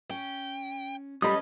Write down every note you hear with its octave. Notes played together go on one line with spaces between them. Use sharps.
C#4 G5
G3 C#4 A4 B4 D#5 B5 D#6